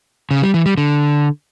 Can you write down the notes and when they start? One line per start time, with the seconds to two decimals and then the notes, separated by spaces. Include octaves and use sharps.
0.31 C#3
0.42 G3
0.54 E3
0.66 G3
0.77 D3